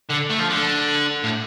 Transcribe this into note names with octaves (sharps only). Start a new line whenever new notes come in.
D3
A3
F3
D3
A2